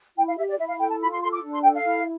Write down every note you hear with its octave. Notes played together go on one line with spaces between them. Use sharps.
E4 G5
F5
G4 E5
D5
E4 E5
F5
A4 G5
A5
F4 B5
C6
A4 C6
D6
D4
C6
A4 G5
F5
E4